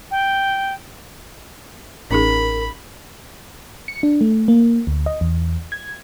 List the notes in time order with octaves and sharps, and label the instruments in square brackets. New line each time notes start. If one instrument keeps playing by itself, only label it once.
[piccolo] G5
[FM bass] A1 [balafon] C#4 D#4 G#4 [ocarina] A#4 [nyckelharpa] B5
[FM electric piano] C#7
D4
A3
A#3
D2
D#5
E2
G#6